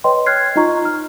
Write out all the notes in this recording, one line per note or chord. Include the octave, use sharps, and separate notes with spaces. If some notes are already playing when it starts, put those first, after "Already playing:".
B4 C#5 D#5 G5 C6
C#5 F6 F#6 G#6 C7
D#4 F4 D#5 A#5 C#6
F6